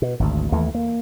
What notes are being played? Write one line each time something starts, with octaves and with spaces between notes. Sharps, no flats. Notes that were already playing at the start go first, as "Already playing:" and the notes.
B2
G#1 D2
D#2 E3 A3
A#3